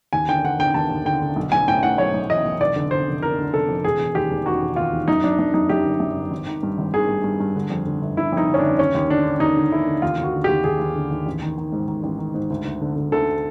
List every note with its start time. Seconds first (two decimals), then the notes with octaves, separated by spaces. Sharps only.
0.13 D#2 G#5
0.28 D3 G5
0.44 D3 F#5
0.59 D3 G5
0.74 D#2 A5
0.90 D#2
1.05 D3 G5
1.22 D3
1.36 B1
1.52 B1 G#5
1.68 A2 G5
1.83 A2 F#5
1.98 B1 C#5
2.14 B1
2.30 E3 D#5
2.45 B1
2.60 F1 D5
2.76 D3
2.91 D3 C5
3.07 F1
3.22 F1 A#4
3.38 D3
3.53 F1 A4
3.69 F2
3.84 E1 G#4
3.99 E1
4.15 D#2 G4
4.30 E1
4.46 D#3 F#4
4.62 E1
4.76 D#2 F4
4.92 E1
5.08 F#2 D#4
5.24 F#2 D4
5.39 F#2 D4
5.54 F#2 D#4
5.69 F#2 G4
5.86 G1
6.00 F#2
6.16 G1
6.31 G#1
6.47 D#3
6.63 G2
6.78 G#1
6.94 D#3 G#4
7.09 G2
7.24 G2
7.40 G2
7.56 D3
7.70 F2
7.86 D3
8.02 G1
8.17 G1 E4
8.33 F2 D#4
8.48 D3
8.54 C#4
8.58 G1 D4
8.78 D#2 C#4
8.95 D#2
9.10 D3 D4
9.25 D3
9.40 D#2 D#4
9.57 D3
9.72 D3 E4
9.87 D3
10.02 D#2 F4
10.18 D#2
10.23 F#4
10.33 D3
10.44 D#2 G4
10.64 D#2 G#4
10.80 D#2
10.95 D3
11.11 D#2
11.26 A1
11.42 D#3
11.58 D#3
11.72 G#2
11.88 D#3
12.03 A1
12.18 D#3
12.34 G#2
12.50 D2
12.65 D2
12.82 D3
12.96 D3
13.12 D2 A4